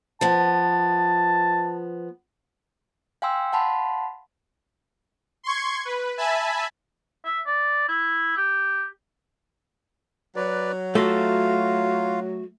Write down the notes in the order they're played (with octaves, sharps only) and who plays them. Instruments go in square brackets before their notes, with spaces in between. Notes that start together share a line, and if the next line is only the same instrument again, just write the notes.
[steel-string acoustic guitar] F3 B3 [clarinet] A5
[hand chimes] F5 G5 G#5 C6 E6
F5 F#5 A5 B5 C6
[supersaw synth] C6 C#6 G#6
B4
E5 G#5 A5 B5
[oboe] E5
D5
E4
G4
[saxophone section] F#3 [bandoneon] B4 D5
[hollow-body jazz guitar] A3 [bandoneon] F4 F5 [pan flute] F#4